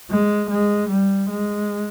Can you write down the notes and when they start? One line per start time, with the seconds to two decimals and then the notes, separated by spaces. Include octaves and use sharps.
0.11 G#3
0.50 G#3
0.89 G3
1.30 G#3